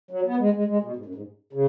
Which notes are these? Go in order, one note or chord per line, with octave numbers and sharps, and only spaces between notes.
F#3
B3
G#3
G#3
G#3
B2
G#2
F#2
G#2
C#3